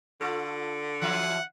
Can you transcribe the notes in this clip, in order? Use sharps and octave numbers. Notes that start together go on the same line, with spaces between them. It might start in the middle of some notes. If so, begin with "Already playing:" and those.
D3 F4 A4
E3 F#3 E5 F#5